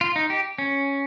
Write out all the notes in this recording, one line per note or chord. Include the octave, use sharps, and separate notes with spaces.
F4
D#4
G4
C#4